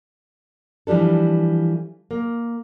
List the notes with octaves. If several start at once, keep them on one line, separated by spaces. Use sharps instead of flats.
E3 F3 G3 D4 A4
A#3